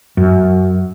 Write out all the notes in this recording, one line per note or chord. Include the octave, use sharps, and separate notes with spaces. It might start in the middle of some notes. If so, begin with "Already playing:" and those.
F#2